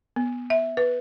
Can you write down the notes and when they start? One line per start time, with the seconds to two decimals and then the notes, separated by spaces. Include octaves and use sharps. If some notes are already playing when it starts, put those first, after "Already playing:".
0.16 B3
0.50 E5
0.77 B4